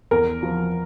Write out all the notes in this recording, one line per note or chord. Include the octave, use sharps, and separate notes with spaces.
E2 A#4
F3